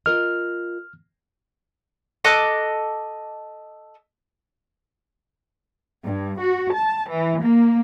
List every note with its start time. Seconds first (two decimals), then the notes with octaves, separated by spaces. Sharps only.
0.06 F4 A#4 D#5 F6
2.24 A4 D#5 D6 F#6
6.04 G2
6.40 F#4
6.75 A5
7.10 E3
7.42 A#3